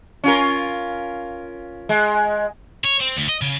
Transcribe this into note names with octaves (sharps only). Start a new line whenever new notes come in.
C#4 F4 A#4
G#3
C#5
C4
D2
D#5
C#3